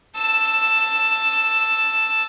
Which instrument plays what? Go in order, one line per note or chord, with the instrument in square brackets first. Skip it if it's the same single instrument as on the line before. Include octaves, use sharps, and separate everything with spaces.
[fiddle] A5 E6